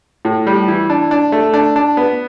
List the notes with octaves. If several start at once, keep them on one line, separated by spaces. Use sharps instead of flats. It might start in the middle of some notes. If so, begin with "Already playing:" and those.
A2
G3
E3
D4
D4
A3
D4
D4
B3